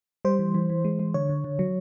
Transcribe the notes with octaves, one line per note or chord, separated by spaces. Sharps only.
G3 C5
E3
E3
E3
G#3
G#3
D3 C#5
D3
D3
F#3